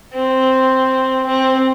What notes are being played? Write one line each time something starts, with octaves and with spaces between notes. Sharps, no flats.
C4
C4